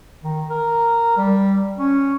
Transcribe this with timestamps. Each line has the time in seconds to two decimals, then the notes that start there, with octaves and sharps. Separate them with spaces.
0.24 D#3
0.50 A#4
1.17 G3
1.78 C#4